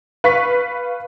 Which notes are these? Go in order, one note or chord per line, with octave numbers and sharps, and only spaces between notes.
B4 F5 C#6 B6